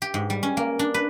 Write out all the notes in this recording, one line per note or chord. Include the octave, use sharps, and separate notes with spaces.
G4
G#2
G3
C#4
A#3
D4
B4